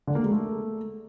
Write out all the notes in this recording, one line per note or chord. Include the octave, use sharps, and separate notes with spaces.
D3
A#3
G#3
A3